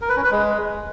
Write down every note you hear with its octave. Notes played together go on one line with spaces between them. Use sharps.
A#4
B4
C#4
B4
G#3